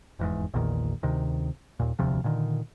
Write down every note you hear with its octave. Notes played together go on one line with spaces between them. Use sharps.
F1 E2 G#2
A#1 E2 A#2 D#3
D2 C3 D#3
D#2 A#2
E1 D2 C3 F3
A#2 D3 D#3